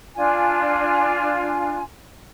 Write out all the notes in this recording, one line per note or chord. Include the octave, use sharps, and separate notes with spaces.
D4 F4 G#5